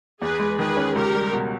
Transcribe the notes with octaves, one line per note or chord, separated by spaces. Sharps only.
E2 G#4 B4
G#3
D#3 G#4 B4
C#4
C#2 G4 A#4
G3
B2